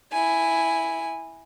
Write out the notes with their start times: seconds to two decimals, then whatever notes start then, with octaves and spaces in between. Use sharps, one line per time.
0.12 E4 G#5